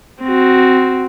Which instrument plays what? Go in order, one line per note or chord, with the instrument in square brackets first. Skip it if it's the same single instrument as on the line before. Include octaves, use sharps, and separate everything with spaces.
[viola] C4 F#4